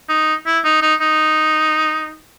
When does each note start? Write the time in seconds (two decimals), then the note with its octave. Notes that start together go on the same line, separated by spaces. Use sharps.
0.09 D#4
0.46 E4
0.64 D#4
0.82 D#4
1.01 D#4